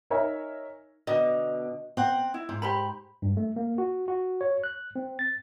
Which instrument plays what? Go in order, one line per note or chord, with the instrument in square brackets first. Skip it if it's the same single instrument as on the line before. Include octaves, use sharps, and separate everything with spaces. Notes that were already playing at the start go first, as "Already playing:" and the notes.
[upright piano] D#4 A#4 C#5 E5 G#5 A#5
[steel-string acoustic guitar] B2 D3 [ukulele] D#5
[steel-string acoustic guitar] C4 F#5
[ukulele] E4
[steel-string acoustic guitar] G#2
[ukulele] G4 C5 B5
[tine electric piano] G2
A3
A#3
F#4
F#4
C#5
F#6
C4
A6